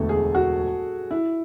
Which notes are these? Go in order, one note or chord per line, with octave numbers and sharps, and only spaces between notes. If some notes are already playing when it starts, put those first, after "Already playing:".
Already playing: E1 D2 D3 A3 A4
G#4
F#4
E4